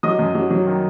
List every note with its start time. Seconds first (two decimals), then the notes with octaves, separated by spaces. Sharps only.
0.03 F#3 D#5 D#6
0.19 F#2
0.35 F#3
0.50 F#3
0.67 D#3